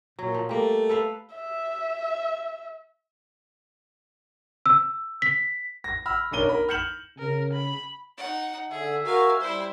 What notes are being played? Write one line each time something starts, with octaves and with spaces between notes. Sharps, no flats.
A#2 F#3
F3
G3 A3 A#3
A4 B4 F5
E5
E6
B6
A#6
B5 E6 F6
B1 C#4 D4 A#4 D#7 G7
A#4 B5
F6 G6 C#7 E7 F#7
C#3 A#4
B5
D#4 F#5
D3 G#4 E5
F#4 A#4 F5 G#5
G3 E4 C5